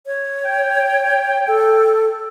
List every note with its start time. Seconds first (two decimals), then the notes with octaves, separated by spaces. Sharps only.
0.06 C#5
0.45 G5
1.47 A4